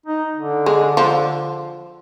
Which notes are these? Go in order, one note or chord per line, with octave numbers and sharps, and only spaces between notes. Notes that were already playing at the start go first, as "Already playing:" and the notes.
D#4
D3
G#3
F3